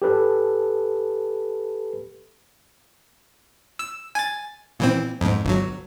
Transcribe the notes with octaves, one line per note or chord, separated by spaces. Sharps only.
G4 A4 B4
E6
G#5 A6
A#2 E3 C4
F2 G#2
G1 F#3